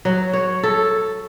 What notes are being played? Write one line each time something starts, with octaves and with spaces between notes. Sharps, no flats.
F#3
C#5
A4